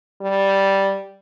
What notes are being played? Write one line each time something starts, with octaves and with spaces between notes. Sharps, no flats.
G3